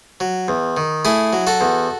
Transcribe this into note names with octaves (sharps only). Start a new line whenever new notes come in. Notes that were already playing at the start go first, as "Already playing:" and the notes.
F#3
E2
D#3
A3 E4 G#4
F#3
F#4 A4
E2